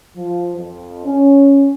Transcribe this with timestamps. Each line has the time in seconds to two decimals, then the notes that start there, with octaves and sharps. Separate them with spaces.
0.17 F3
0.57 F2
1.06 C#4